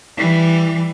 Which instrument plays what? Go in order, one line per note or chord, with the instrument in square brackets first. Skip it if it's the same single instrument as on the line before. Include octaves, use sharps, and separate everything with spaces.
[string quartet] E3 G3